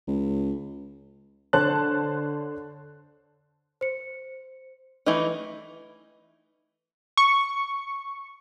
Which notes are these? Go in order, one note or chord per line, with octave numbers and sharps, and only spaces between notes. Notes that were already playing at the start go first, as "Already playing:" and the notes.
C#2
D3 C5 C#5 A5 F#6
C5 C#7
E3 A3 D#4 B4 D#5 G7
C#6